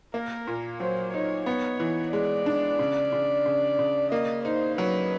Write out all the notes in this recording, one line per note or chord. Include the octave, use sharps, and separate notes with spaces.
A#3 A#4
A#2
F#3 C5
D#4 C#5
B3 C#5
E3
G#3 D5
D4
C#3
C#3
C#3
C#3
A#3 D#5
D#4 C5
F#3 B4